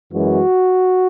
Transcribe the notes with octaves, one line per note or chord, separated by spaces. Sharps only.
F#2 E3 G#3 F#4